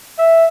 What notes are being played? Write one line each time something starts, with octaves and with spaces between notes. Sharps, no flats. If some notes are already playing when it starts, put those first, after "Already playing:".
E5